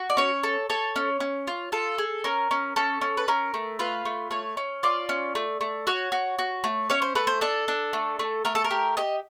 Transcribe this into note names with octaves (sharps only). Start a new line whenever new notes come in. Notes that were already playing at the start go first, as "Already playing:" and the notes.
Already playing: F#4
D5
C#4 C#5
A4
A4 C#5
C#4
C#4
F4
F4 A4
G#4
C#4 A#4
C#4
C#4 A4
C#4
B4
C#4 A#4
A3
F4 B4
A3
A3 C#5
C#4
F4 D5
C#4
A3
A3
F#4 C#5
F#4
F#4
A3
C#4 C#5
C5
A3 B4
C5
D4 A4
D4
A3
A3
A3 A#4
A4
A#4
G4
G4 D#5